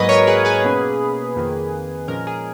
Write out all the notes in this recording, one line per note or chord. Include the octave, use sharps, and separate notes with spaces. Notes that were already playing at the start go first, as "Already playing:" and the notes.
Already playing: G#2 F#3 A#3 B4 D#5
A#4 C#5
G#4 B4
G#4 B4
B2 A#3 C#4
F2 D#3 A#3
A#2 F3 G#3 C#4 A#4
G#4